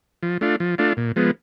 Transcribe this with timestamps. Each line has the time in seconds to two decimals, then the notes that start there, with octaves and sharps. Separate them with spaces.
0.23 F3
0.41 A3 D4 F4
0.60 F3
0.78 A3 D4 F4
0.97 A#2
1.16 F3 G#3 B3